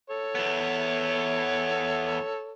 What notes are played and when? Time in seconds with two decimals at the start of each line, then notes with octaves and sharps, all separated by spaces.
0.10 A4 C#5
0.35 E2 B3